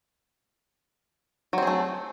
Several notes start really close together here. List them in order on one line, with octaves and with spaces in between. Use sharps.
F#3 C4 G#4 A3